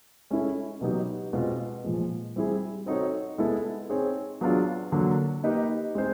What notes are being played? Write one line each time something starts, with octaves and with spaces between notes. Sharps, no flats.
G#3 C#4 E4 A4
B2 F#3 B3 D#4 G4
B2 G#3 C4 F4
A#2 F3 G#3
G3 C4 E4 G#4
C4 D#4 F#4 A4 C#5
G#3 B3 E4 A4
C4 D#4 G#4 C#5
F#3 B3 D4 F4 G#4
D3 F#3 A#3 D4
A#3 D#4 G4 B4 D#5
G#3 C4 D#4 G#4 C5